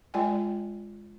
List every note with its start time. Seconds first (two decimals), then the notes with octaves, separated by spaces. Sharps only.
0.14 G#3 F4 D5 G5 G#5